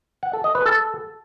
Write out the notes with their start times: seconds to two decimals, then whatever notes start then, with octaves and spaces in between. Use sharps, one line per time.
0.23 F#5
0.33 A4
0.44 D#5
0.55 B4
0.66 A4